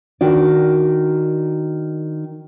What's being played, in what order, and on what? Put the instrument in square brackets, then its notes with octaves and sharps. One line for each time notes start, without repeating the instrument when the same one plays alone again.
[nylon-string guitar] D#3 D4 F#4 D5